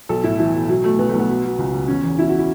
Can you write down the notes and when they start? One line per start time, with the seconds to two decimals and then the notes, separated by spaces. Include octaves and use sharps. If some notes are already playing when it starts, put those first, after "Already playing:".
0.09 B1 A4
0.24 A2 E4
0.39 E3 E4
0.54 B1
0.68 B2 F#3
0.83 B2 A3
0.99 B1 B3
1.09 B1 A3
1.19 B3
1.29 B2
1.44 B2
1.58 C#2
1.73 C#2
1.88 E1 C#4
2.03 E2
2.19 B2 E4
2.29 F#4
2.39 E4